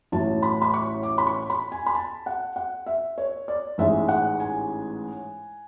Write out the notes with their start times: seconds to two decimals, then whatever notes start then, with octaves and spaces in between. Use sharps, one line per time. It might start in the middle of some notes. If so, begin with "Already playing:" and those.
0.12 A1 A2 F#3 A5
0.43 B5
0.62 B5
0.74 C#6
1.03 D6
1.18 B5
1.27 C#6
1.50 B5
1.72 G#5
1.86 B5
1.95 A5
2.26 F#5
2.56 F#5
2.86 E5
3.18 C#5
3.48 D5
3.78 A1 G#2 G#3 E5
4.08 F#5
4.40 G#5